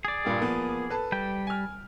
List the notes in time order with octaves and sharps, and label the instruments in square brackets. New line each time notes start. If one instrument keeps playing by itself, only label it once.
[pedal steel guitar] G#4 D5
[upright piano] G2 A#2 G3
F3 A#3 B3
A4 B4 A5
[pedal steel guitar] G3 G5
[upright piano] G#5 F6